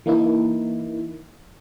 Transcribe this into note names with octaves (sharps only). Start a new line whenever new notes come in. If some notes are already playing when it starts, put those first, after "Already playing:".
E3 A#3 D#4 E4